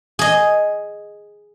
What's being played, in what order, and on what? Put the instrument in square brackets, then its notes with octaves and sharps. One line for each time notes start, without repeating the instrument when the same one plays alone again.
[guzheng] G#4 D#5